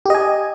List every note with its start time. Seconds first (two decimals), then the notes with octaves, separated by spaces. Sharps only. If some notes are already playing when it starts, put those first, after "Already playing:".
0.06 G4
0.10 D#5
0.15 G#5